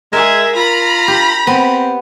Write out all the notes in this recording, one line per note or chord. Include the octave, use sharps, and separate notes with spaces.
G#3 G#4 A#4 E5
F4 A#5 B5
G4
B3 C4